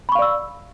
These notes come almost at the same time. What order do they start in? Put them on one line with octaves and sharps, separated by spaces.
B5 C#6 F5 D5 E6